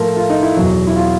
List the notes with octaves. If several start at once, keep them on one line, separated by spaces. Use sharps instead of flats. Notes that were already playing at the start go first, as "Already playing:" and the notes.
Already playing: A2 F3 A3 A#4
F4
D#4
E4
E2 B2 F#3
E4
F4